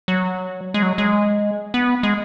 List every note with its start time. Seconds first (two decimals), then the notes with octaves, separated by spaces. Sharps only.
0.08 F#3
0.74 G#3
0.83 F#3
0.98 G#3
1.74 B3
2.03 G#3